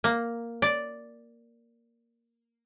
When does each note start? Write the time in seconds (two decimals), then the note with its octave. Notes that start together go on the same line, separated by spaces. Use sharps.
0.04 A#3
0.62 D5